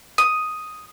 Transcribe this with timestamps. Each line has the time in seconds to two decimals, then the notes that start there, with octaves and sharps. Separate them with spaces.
0.18 D#6